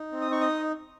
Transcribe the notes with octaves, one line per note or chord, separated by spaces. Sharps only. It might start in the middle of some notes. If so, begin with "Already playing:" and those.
Already playing: D#4
C4
D#6
D#4 C#6
D#5 D#6